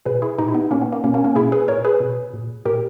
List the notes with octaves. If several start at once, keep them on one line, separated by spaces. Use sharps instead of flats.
B2 G#4 B4
E4 G#4
A#2 D#4 G4
E4
B3 D#4
A#2 A#3 C#4
B3
A#3
B2 A#3 C#4
A#3 C#4
A#3 C#4
B2 E4 G#4
G#4 B4
A#2 A#4 C#5
G#4 B4
B2
A#2
A#2 G4 A#4